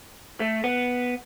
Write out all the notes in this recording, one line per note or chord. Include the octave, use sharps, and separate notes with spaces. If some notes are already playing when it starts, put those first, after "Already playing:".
A3
B3